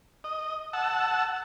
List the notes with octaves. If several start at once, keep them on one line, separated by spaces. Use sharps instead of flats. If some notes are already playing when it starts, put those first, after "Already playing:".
D#5
F#5 A5 E6